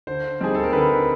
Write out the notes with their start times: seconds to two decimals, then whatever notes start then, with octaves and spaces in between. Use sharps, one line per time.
0.07 D3 C5
0.41 G3 C4 D#4 G#4
0.55 A4
0.63 A#4
0.73 D3 B4